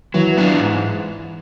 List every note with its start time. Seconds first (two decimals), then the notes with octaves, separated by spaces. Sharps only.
0.14 E3 F#3
0.37 B3 D4 F4
0.60 G#2